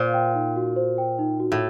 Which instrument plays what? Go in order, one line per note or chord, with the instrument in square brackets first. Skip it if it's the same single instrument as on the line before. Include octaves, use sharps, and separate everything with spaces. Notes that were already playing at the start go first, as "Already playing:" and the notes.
Already playing: [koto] A#2 [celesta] C5
[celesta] G5
D#4
F#4
C5
G5
D#4
F#4
[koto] A2